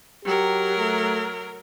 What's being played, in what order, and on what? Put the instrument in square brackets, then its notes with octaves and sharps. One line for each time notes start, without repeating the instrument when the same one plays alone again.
[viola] F#3 A#4 [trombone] G4
[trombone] A3